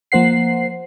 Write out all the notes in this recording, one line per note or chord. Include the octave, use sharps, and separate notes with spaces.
F3 A#3 C5 F#5 C7